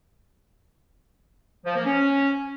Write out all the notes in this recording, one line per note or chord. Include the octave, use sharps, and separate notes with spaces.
F3
A#3
C#4